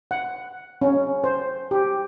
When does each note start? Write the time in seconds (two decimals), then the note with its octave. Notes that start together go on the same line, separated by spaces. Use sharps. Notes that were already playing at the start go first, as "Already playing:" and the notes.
0.11 F#5
0.82 C#4
1.24 C5
1.71 G4